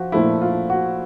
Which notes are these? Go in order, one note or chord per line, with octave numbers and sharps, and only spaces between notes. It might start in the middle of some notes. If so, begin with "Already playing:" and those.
Already playing: F3 F#4
A#2 F3 A3 E4
F4
F#4